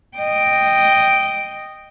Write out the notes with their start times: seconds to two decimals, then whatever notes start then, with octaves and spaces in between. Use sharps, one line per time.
0.17 D#5 G5